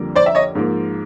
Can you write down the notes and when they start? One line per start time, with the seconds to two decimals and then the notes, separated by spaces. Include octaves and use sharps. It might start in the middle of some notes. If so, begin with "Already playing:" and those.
Already playing: F2 D3 G3 A#3
0.15 C5 D5
0.26 E5
0.35 C#5 D#5
0.55 G#2 F3 A#3